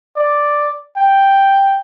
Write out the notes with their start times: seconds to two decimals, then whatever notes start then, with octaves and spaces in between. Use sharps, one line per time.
0.16 D5
0.97 G5